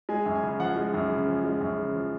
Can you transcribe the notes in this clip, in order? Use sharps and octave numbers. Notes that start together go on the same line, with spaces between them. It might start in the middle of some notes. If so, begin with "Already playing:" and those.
G#3 G#5
F#2
G#5
C#3
F3 F#5
G#3
F#2
C#3
F3
G#3
F#2
C#3
F3